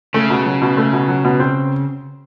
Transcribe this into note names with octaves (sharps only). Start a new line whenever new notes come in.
C#3 A3
B2
F#3
B2
A3
B2
F#3
B2
C4